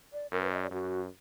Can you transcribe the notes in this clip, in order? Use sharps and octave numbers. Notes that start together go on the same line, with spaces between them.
D5
F#2 A#4
B4
D#5
D5
F#2 F#4